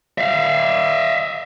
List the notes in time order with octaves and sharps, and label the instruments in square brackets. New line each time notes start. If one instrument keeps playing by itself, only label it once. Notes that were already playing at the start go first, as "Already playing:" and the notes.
[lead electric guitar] E5 F5